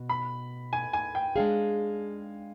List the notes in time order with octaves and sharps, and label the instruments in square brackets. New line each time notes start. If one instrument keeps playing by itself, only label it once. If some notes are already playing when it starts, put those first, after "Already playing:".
Already playing: [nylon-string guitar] B2
[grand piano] B5
G#5
G#5
G5
[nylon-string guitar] G#3 D4 G#4 [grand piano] F5